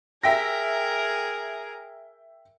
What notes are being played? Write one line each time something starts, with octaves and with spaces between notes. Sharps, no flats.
G#4 A#4 E5 G5 A#6